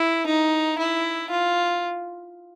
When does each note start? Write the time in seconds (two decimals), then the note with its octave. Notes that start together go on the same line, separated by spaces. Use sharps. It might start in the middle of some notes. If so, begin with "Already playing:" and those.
Already playing: E4
0.26 D#4
0.79 E4
1.30 F4